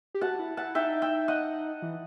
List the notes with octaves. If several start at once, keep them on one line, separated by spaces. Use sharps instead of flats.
G4
F#4 F#5 A5
E4
E4 F#5 A5
D#4 E5 G5
E5 G5
D#5 F#5
E3